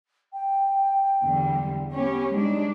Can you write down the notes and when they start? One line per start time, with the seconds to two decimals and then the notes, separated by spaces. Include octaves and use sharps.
0.33 G5
1.23 E2 D3 G3
1.94 B3 C#4 G4
2.33 G3 G#3 D4 D#4